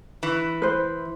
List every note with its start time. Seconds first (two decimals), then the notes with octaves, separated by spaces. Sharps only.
0.23 E3
0.62 B4 C5